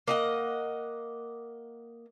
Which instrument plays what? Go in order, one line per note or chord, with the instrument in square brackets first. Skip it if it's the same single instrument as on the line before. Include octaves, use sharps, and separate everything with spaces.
[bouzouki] A#3 D#5 F#5